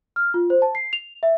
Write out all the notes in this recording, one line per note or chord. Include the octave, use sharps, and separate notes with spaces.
F6
F4
C5
A5
C7
F7
E5